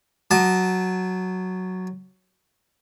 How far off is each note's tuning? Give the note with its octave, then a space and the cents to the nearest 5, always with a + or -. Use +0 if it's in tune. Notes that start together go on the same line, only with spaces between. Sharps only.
F#3 +0 A5 -25 D#6 -45